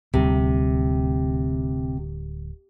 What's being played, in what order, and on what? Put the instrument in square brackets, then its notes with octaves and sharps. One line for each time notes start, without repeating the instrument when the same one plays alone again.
[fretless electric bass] D1 D2 G3 [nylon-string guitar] C3